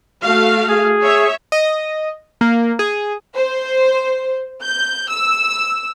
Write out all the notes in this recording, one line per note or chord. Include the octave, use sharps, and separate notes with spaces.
A3 F#4 F5
G#4
C#5 E5
D#5
A#3
G#4
C5
G6
E6